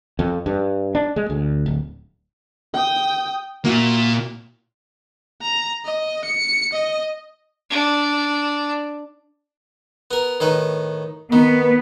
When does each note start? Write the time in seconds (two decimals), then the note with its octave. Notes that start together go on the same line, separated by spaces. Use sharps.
0.19 F2
0.46 G2
0.95 D4
1.16 G#3
1.30 D2
1.66 D1
2.74 G5 D#6
3.65 A#2 A#3 E4 F#4
5.42 A#5
5.85 D#5
6.25 C#7
6.73 D#5
7.70 D4
10.11 B3 A#4
10.40 A2 D#3 B4
11.32 D#3 B3